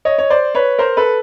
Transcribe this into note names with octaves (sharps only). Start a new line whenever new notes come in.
C#5 D#5
C#5
C5 D5
B4 C#5
A#4 C5
A4 B4